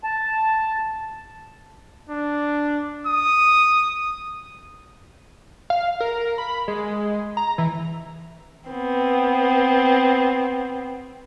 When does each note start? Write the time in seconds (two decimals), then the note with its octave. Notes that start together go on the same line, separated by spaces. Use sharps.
0.04 A5
2.09 D4
3.06 D#6
5.70 F5
6.00 A#4
6.38 B5
6.68 G#3
7.37 A#5
7.58 E3
8.70 B3 C4